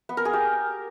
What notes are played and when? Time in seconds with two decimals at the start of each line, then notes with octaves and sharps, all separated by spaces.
0.09 B3
0.17 A#4
0.25 G#4
0.33 G4